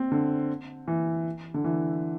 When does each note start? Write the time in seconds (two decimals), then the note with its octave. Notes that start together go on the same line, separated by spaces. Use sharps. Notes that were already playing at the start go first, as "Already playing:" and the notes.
Already playing: C4
0.12 D3
0.88 E3
1.54 D3
1.64 E3